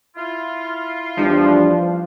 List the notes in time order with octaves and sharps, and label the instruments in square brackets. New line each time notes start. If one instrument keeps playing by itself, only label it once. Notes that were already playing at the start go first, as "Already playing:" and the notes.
[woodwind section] E4 F4
[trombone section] E2 G3 D4 [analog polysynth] F3